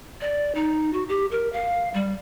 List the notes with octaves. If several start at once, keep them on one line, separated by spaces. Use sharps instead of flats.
D5
D#4
F#4
G4
A#4
F5
G3